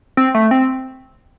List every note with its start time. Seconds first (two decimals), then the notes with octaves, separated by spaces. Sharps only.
0.17 C4
0.35 A3
0.51 C4